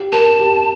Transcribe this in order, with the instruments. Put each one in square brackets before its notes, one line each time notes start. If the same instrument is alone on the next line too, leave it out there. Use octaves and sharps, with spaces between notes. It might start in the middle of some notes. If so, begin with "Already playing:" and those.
Already playing: [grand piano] G4
[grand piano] A#4 [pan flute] A5
[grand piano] G4